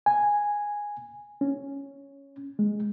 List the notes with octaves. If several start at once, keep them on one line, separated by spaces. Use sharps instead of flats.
G#5
C#4
G#3